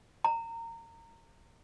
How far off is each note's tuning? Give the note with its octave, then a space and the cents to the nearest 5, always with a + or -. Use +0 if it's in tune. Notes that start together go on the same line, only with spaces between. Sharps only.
A#5 -25